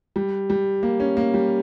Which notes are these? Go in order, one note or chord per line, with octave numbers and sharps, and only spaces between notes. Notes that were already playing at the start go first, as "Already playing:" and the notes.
G3
G3
A#3
C#4
A#3
G3